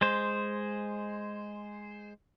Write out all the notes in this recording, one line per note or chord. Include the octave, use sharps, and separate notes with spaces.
G#3 C5